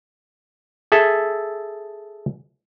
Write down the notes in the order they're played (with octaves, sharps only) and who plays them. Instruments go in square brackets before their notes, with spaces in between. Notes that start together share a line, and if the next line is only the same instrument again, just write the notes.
[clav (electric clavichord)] G#4 A4 E5